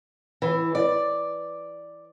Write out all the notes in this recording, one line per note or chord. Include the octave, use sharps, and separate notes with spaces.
E3
D5